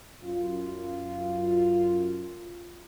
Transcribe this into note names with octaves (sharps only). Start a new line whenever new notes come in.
F#2 F4